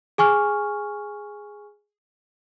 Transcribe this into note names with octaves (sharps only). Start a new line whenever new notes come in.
G#4 G#5 C#6 F6